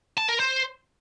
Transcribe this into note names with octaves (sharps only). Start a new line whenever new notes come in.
A5
A#4
C5